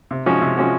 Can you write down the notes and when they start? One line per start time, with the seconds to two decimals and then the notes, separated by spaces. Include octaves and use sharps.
0.11 C3
0.26 F3 G#3 C#4 F#4
0.42 C3
0.57 F3 G#3 C#4 F#4